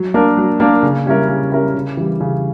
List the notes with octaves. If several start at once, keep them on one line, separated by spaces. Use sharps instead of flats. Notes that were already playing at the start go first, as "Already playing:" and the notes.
Already playing: F#3
A#3 D4 A#4
F#3
A#3 D4 A#4
C#3
G3 C#4 E4 A#4
C#3
G3 C#4 E4 A#4
C#3
E3 G3
C#3